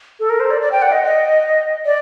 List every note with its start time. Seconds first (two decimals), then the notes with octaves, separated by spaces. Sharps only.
0.20 A4
0.30 A#4
0.40 C5
0.51 D5
0.62 D5
0.72 G5
0.82 F#5
0.92 D#5
1.03 D#5
1.86 D5